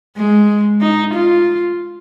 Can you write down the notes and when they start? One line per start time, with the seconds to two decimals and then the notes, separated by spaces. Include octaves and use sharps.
0.17 G#3
0.81 D#4
1.14 F4